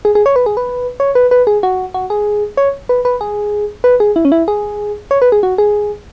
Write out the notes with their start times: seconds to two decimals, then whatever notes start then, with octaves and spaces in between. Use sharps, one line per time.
0.05 G#4
0.15 G#4
0.26 C#5
0.36 B4
0.46 G#4
0.57 B4
1.00 C#5
1.15 B4
1.31 B4
1.47 G#4
1.63 F#4
1.94 F#4
2.10 G#4
2.57 C#5
2.89 B4
3.05 B4
3.21 G#4
3.84 B4
4.00 G#4
4.16 E4
4.25 C#4
4.32 E4
4.48 G#4
5.11 C#5
5.22 B4
5.32 G#4
5.43 F#4
5.58 G#4